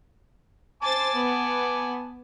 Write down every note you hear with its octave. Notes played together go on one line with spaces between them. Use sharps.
C5 G#5 A5 D6 A6
B3